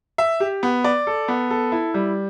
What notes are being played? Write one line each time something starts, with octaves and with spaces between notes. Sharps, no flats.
E5
G4
B3
D5
A4
B3
A4
E4
G3